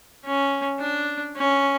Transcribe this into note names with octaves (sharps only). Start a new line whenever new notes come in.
C#4
D4
C#4